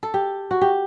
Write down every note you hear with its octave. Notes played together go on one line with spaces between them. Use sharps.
A4
G4
F#4
G4